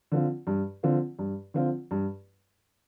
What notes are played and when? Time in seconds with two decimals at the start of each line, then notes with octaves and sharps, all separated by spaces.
0.12 D3 F3 C4 F4
0.47 G2
0.83 D3 F3 C4 F4
1.19 G2
1.54 D3 F3 C4 F4
1.91 G2